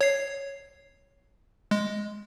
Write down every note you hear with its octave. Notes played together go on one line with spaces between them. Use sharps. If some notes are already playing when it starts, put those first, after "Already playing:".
C#5 C7
G#3